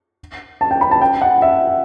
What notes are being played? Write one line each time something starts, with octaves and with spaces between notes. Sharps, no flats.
A5
G5
B5
A5
G5
F#5
E5